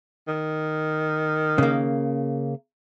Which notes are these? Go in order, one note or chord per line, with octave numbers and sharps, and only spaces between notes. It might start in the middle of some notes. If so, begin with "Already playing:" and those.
D#3
C#3 A#3